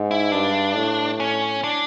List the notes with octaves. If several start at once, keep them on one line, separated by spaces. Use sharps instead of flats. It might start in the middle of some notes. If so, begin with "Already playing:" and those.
Already playing: G#2
E4
G2 D4
A2
C#4
D4